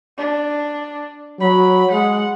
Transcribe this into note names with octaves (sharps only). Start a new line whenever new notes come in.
D4
F#3 B5
G#3 F#5